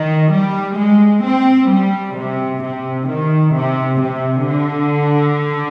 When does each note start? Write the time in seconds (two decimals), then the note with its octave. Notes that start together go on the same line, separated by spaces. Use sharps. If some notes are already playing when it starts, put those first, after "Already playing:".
Already playing: D#3
0.32 G3
0.78 G#3
1.24 C4
1.70 G3
2.16 C3
2.63 C3
3.08 D#3
3.55 C3
4.01 C3
4.47 D3